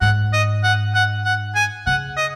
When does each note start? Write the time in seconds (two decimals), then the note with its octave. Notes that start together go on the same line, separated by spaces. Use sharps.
0.01 G#2 F#5
0.33 D#5
0.64 F#5
0.94 F#5
1.25 F#5
1.55 G#5
1.86 C#3 F#5
2.17 D#5